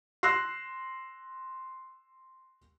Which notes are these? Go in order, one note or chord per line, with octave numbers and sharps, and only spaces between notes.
C6 E6 F#6 A#6 C7